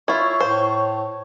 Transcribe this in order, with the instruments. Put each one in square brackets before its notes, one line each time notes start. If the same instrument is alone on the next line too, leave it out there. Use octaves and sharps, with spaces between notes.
[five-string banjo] E4 F4 [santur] C#5 [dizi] C#6
[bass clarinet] A2 [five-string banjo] C5